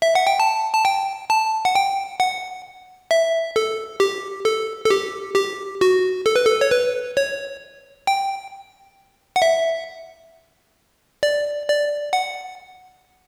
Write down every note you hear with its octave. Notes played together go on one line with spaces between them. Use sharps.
E5
F#5
G5
A5
A5
G5
A5
F#5
G5
F#5
E5
A4
G4
A4
A4
G4
G4
F#4
A4
B4
A4
C#5
B4
C#5
G5
F#5
E5
D5
D5
F#5